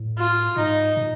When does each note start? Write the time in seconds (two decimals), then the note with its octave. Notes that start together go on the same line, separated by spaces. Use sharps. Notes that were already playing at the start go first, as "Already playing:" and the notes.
Already playing: A2
0.18 F4
0.57 G#2 D#4
0.97 A#2